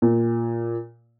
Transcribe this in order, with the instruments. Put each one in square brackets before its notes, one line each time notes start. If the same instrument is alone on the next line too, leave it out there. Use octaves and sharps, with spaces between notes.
[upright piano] A#2